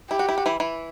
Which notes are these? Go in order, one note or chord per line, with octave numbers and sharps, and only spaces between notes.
E4 G4
F#4
E4
F#4
E3 E4
E3 E4